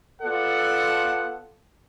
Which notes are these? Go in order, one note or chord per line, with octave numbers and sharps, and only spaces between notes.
B3 F4 A4 D5 F#5